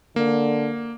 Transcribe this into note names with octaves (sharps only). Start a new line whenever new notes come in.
D3 A#3